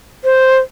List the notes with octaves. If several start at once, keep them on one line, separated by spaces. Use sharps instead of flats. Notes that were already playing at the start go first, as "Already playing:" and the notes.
C5